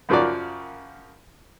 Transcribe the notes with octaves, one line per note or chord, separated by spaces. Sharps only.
F#2 C#3 F3 F#4 A#4 D5